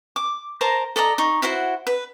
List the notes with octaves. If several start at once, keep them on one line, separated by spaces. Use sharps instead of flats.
D6
A#4 C5 A5 A#5
A4 D5 D#5 A#5
D#4 C#6
E4 F#4 C5 F#5
B4